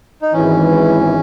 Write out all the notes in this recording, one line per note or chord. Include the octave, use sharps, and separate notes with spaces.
D#4
G#1 G#2 E3 C#4